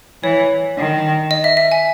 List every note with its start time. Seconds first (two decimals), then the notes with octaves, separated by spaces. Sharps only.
0.23 E3 C#5
0.77 D#3
1.31 D#5
1.44 E5
1.57 E5
1.72 G#5